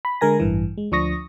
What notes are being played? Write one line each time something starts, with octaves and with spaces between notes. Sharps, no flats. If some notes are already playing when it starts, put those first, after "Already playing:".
B5
D3 G#3 A#4 G#5 A#6
A1 G2 E3
G#3
D2 F3 D4 C#6 D#6 A#6